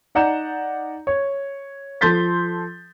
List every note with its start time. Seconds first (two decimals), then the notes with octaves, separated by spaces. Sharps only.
0.15 D#4 D5 F#5 A#5 G6 E7
1.07 C#5
2.01 F3 A4 C6 G6 A6 B6